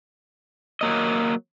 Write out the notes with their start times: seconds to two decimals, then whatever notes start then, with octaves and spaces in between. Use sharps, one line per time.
0.81 F#3 A#3 D#5